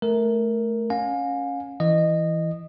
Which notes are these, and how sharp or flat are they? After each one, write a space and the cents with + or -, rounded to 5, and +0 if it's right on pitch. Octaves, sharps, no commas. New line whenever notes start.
A3 -10 A#4 +0
C#4 +0 F5 +35 G#5 +0
E3 +0 D#5 -15